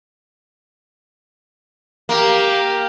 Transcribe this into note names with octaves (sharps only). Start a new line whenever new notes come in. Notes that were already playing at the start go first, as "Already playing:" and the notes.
A#3 G4 F5